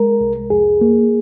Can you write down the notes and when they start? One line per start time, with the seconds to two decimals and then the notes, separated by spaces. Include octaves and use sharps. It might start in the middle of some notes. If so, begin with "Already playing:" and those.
Already playing: G#3 A#4
0.21 C2
0.50 F2 G#4
0.81 A#3